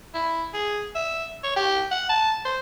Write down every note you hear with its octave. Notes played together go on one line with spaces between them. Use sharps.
E4
G#4
E5
C#5
G4
F#5
A5
C5